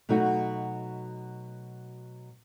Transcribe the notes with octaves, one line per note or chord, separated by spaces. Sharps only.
B2 F#3 A3 D#4 F#4